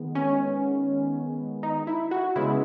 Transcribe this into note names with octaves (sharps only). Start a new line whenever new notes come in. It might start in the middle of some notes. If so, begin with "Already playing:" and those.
Already playing: D#3 G#3 B3
C#4
D#4
E4
F#4
C#3 G#3 B3 E4